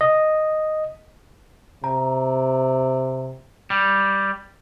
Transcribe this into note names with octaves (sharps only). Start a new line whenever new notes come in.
D#5
C3 A#5
G3